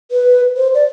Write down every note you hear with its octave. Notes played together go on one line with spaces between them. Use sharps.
B4
C5
D5